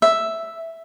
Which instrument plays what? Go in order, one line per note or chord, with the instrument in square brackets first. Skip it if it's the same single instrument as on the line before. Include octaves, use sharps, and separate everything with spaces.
[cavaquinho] E5